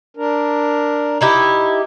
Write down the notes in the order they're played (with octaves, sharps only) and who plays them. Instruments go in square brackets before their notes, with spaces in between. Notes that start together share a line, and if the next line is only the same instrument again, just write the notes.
[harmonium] D4 A#4
[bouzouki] D#4 E4 G4